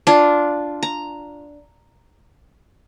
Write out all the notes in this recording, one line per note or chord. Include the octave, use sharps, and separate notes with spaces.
D4 F4
A#5